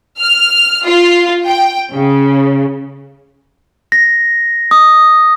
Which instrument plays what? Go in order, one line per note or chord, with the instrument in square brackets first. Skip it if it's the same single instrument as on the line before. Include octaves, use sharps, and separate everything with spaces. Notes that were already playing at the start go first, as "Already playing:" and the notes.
[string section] F6
F4
G5
C#3
[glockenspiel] A#6
D#6